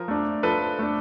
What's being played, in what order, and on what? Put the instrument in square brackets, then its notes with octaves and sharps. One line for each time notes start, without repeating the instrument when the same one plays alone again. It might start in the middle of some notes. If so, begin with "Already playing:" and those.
Already playing: [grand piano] F3 A#4
A3 D4
F3 A4 B4
A3 D4